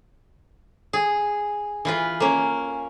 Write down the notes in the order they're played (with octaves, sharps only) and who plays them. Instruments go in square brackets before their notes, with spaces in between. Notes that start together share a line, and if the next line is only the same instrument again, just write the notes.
[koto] G#4
E3 F4 B4
A#3 C#4